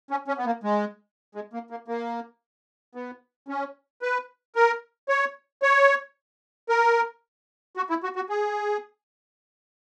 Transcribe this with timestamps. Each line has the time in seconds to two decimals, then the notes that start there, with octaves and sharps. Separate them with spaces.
0.10 C#4
0.28 C#4
0.38 B3
0.46 A#3
0.63 G#3
1.35 G#3
1.53 A#3
1.70 A#3
1.88 A#3
2.95 B3
3.48 C#4
4.02 B4
4.55 A#4
5.09 C#5
5.62 C#5
6.69 A#4
7.77 F#4
7.89 E4
8.03 F#4
8.15 F#4
8.29 G#4